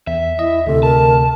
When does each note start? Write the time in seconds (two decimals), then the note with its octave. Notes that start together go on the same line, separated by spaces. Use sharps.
0.07 E2 E5
0.39 E4 D#5
0.67 D2 C3 A4
0.83 A#4 A5